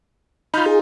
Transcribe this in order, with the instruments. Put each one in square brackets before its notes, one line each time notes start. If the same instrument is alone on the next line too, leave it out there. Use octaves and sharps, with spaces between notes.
[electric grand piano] D#4 F4 [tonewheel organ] B5 F6 G6
[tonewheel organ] G#4